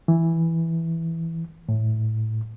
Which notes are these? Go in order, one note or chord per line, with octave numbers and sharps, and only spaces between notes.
E3
A2